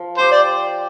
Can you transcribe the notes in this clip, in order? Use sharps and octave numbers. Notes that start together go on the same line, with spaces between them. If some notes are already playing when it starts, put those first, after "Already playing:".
Already playing: F3
G4 C5
D5